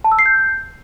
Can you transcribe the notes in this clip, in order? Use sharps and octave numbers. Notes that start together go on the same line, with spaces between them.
A5
E6
C7
G6